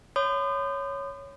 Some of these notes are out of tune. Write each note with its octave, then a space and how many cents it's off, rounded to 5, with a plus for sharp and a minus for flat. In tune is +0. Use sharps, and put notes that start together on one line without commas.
C#5 +0 B5 +45 D#6 -35